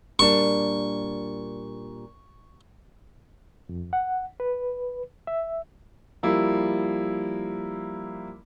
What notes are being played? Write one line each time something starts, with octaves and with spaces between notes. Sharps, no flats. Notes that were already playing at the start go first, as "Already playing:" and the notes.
A#2 G3 D4 C#6
F2
F#5
B4
E5
F3 G3 A#3 E4